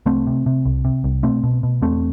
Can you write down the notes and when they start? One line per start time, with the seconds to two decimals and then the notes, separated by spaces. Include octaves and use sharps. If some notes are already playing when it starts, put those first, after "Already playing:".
0.06 C2 A3 C4
0.27 C3
0.46 C3
0.65 C2
0.85 C3
1.04 C2
1.23 B2 A3 C4
1.43 B2
1.63 B2
1.82 E2 A3 C4